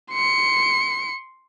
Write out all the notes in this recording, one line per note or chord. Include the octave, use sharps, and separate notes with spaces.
C6 C#7